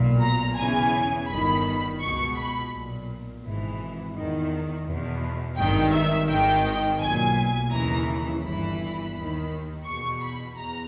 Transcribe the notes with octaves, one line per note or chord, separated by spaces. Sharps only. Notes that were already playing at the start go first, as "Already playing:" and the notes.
Already playing: B1 A#2
A#5
E2 C#3 E3 G#5
G1 G2 D#3 B5
C#2 B2 C#6
B5
B1 A#2
G#1 G#2 E3
E2 D#3
E2 B2
G#1 G2 D#3 G5
E5
G#1 G#2 D#3 G5
B1 A#2 G#5
D#2 C#3 E3 A#5
G1 G2 E3 B5
D#2 D#3
E2 B2 C#6
B5
E2 A#5